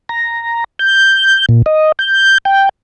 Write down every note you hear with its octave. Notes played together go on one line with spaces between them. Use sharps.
A#5
G6
A#2
D#5
G6
G5